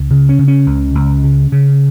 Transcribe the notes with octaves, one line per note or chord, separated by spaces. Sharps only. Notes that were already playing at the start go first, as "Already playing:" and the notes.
Already playing: C#2
C#3
C#4
C#3
C#4
C#2
C#2
C#3
C#3